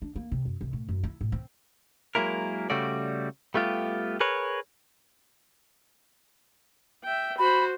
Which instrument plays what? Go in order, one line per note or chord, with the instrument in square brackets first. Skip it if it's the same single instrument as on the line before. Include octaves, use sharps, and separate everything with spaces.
[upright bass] D4
A#3
C3
F#2
C2
A2
F#2
E4
A2
C4
[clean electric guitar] F#3 G#3 A#3 E4 A#4
C#3 G3 A3 F#4 D5
G3 A3 B3 F4 G4
G#4 A#4 B4 C#5
[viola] E5 G5
[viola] F#4 C5 [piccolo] B5